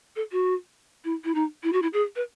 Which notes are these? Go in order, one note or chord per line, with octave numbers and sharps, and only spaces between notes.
A4
F#4
E4
E4
D#4
E4
F#4
E4
G#4
B4